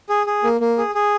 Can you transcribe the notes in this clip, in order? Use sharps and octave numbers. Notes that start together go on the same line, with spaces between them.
G#4
G#4
A#3
A#3
G#4
G#4